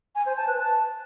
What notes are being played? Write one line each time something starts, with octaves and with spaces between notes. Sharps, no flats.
G#5
C5
A5
B4
A5